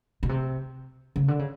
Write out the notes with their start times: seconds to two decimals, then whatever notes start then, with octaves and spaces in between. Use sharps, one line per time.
0.23 B2
0.29 C3
1.16 C#3
1.28 D3
1.39 C#3